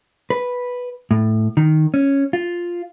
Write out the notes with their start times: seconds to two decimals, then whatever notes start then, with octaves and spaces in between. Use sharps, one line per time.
0.30 B4
1.11 A2
1.57 D#3
1.94 C#4
2.33 F4